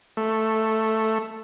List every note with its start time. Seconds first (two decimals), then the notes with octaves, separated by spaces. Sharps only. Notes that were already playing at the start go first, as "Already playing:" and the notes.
0.17 A3